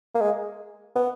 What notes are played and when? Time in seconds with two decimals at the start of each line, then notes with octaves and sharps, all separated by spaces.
0.14 A#3
0.21 G#3
0.95 B3